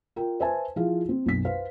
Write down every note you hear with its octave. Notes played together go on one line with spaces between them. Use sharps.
F4 A#4 G5
B4 C5 E5 G#5 A5
F3 E4 F4 G#4 F5
C4
B1 F#2 B6
B4 C5 F5